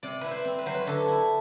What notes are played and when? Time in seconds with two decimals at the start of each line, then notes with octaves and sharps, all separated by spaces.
0.03 C3 D5
0.21 E4 B4
0.31 C5
0.45 C4
0.59 B4
0.66 F#3 C5
0.74 B4
0.87 D3 A4
1.08 E4